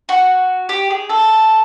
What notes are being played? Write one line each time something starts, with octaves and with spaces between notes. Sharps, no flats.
F#4
G4
G#4
A4